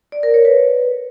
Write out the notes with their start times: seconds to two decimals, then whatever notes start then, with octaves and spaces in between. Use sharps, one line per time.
0.12 D5
0.23 A#4
0.34 C#5
0.45 B4